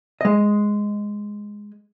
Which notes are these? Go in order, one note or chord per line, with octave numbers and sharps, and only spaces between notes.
G#3 D#5